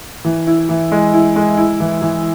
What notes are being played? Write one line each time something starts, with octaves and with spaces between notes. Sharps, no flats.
E3
E4
E3
G#3
E4
G#3
E4
E3
E3